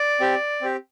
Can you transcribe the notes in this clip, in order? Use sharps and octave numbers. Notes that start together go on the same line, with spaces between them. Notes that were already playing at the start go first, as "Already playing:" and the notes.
Already playing: D5
C4 G4
C4 G4